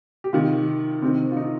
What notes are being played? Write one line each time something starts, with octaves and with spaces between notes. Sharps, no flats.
G4
C3 D#3 F4
C3 D#3 C4
F4
D#4